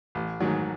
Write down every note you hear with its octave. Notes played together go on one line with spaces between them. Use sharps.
A1
G#2 D#3 F#3